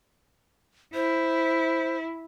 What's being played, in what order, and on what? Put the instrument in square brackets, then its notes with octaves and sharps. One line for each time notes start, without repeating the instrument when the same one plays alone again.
[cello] E4 [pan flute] C5